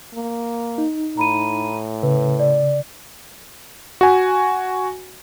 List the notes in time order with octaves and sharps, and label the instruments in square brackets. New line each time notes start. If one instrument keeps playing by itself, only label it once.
[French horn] A#3
[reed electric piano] D#4
[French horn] A2 [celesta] A#5 B5 D#7
[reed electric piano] C#3 [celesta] B4
[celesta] D5
[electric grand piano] F#4 G#5